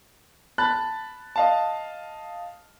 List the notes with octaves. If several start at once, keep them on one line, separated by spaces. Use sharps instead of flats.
A5 B5 F#6 A6
D#5 F5 A5